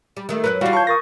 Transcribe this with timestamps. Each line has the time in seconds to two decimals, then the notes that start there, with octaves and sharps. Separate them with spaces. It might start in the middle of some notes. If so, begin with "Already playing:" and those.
0.17 G3
0.29 D#3 A3
0.44 F#2 F#3 A#4 B4 F#6
0.61 E3 G3 F4 F#4 D5 F5
0.73 C#5 A5 C#6 G6
0.87 A#4 C#6 D#6 A6 A#6